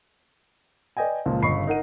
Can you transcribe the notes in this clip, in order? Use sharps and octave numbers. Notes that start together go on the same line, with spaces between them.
B4 D5 D#5 G5 G#5
C#2 A#2 F3
G1 C#3 D#5 B5 C#6 C7
D#4 A#4 F#5 D#7